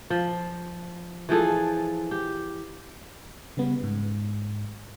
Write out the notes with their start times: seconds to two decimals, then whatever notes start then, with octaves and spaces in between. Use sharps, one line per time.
0.10 F3
1.29 E3 F3 G#4 A4
2.11 G4
3.57 C#3 G3 B3
3.83 G#2